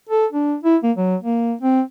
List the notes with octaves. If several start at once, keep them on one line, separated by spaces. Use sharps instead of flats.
A4
D4
E4
A#3
F#3
A#3
C4